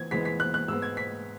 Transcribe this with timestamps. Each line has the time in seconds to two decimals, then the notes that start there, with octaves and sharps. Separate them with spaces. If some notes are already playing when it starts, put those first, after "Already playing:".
Already playing: E3 B3 G#6
0.11 E2 E3 G#3 B3 B6
0.25 B6
0.40 F#6
0.54 F#6
0.68 G#2 G#3 B3 E6
0.82 G#6
0.97 B6